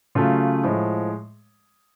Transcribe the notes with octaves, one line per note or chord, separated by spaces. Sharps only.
C#3 F#3 A3 F4
A2 F3 G#3